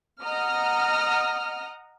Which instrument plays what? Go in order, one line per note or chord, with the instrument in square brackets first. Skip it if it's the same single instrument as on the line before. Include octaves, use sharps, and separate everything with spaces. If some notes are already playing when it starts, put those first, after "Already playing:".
[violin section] D#5 F#5 A#5 D#6 F6